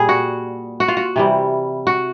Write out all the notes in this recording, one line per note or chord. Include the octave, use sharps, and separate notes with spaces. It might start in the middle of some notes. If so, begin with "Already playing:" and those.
Already playing: A#2 G3 G#4
F#4
F#4
F4
F#4
C3 E3 G3
F#4